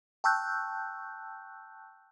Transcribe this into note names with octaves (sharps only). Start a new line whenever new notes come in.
G5 A5 C#6 E6 F#6 G6